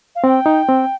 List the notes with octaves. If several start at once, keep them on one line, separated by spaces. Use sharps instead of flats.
F5
C4 G5
D#4
C4